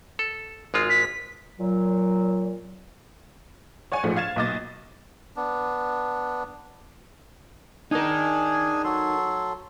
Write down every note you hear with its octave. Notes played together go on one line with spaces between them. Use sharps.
A4
G#1 G#3 F4
B6
A#2 F#3
C#5 D5 F#5 G#5
A#1 G#2 F3 A3
F5 G#6 A6 E7
B1 A#2 D#5 D6 A6
B3 D4
D4 D#4 G#4 A#4 G#5
F#3 A4 C6